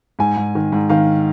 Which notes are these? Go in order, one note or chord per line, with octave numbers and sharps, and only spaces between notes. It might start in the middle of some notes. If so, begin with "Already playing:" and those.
G#2 G#5
G#2
D#3
G#2
D#3 F5